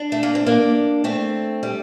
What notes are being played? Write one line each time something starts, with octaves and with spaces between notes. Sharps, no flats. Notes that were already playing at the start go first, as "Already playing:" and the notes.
Already playing: D4
A3
A#3
C4
A#3 D4
A3 C4
G3